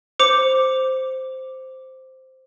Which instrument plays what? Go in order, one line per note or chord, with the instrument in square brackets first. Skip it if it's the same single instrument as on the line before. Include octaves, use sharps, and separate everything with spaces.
[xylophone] C5 D6 C#7 F7